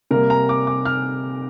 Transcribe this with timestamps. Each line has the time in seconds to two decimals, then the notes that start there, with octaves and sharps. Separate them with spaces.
0.11 C3 G3 A#3 A#4
0.30 A#5
0.49 D6
0.67 D6
0.85 F6